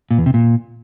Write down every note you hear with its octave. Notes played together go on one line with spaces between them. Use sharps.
A#2
E2
C3
A#2